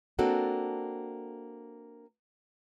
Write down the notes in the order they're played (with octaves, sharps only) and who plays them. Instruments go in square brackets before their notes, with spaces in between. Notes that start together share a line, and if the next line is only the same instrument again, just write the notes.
[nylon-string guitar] A#3 C4 D4 F#4 A4